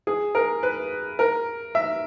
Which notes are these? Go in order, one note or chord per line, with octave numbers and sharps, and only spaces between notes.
G#4
A#4
B4
A#4
E5